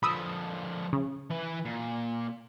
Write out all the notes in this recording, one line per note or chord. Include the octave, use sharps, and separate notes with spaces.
D3 F3 B5 D#6 E6
C#3
E3 B4
A#2